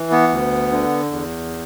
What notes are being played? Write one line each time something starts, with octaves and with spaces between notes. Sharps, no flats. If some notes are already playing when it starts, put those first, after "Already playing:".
Already playing: E3
B3
D2
D3
E2